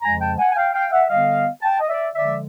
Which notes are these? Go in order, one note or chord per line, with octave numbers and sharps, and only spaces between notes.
F2 C#3 F3 G#3 G#5 A#5
G5 A5
F#5 G#5
G#5
F5 G5
F5 G5
E5 F#5
D3 G3 B3 D#5 F5
G5 A5
D#5
D5 E5
D3 F3 G#3 D5 E5